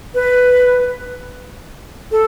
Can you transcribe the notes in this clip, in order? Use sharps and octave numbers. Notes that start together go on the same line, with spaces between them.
B4
A4